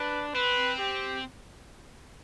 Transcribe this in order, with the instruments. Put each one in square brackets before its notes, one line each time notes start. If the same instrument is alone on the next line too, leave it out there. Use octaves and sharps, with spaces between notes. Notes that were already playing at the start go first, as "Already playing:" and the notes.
Already playing: [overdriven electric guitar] D4 [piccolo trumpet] B4
[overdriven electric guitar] C4 [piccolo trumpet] B4
[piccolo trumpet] G4